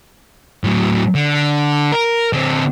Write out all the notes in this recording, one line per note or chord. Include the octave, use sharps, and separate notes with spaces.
A2 F#3
D3
A#4
D3 C4